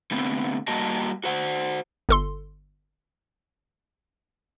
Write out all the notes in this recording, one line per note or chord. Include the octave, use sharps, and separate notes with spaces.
D3 A3 B3 C4
G3 A#3 F#4 D#5 A5
F#4 C5 F#5
G1 A4 C6